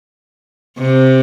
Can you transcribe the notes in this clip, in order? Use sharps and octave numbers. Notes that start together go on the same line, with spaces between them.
C3